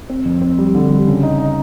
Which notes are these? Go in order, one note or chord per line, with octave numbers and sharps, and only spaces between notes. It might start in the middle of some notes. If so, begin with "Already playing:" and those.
C4
F2
C4
G3
D3
G3
C#3
D#4
D#4